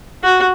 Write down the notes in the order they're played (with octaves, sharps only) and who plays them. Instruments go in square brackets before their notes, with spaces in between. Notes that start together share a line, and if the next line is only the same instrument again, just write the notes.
[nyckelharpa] F#4